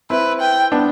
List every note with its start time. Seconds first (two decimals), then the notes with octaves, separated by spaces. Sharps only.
0.10 C4 E4 B4
0.41 G5
0.72 B3 D4